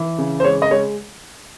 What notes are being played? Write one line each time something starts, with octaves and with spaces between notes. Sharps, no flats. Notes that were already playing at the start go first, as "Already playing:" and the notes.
Already playing: E3
C#3
C5
G#3 C#5
D#5
G#3 C#5